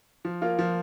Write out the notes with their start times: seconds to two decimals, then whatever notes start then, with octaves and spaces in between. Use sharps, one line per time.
0.25 F3
0.42 A#3 F4
0.59 F3